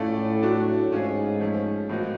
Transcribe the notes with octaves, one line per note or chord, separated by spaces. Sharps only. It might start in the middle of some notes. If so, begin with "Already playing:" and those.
Already playing: A2 A3 C#4 F4 A4 D5
F#3 A3 D4 F#4
G#2 A3 C#4 F4 G#4
F3 A3 C#4
A2 F3 A#3 D#4 F#4